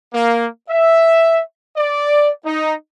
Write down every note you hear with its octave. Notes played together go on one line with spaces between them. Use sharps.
A#3
E5
D5
D#4